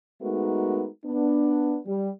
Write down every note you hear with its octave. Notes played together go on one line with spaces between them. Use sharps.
G#3 A3 B3 D#4 F#4 A#4
B3 D4
G3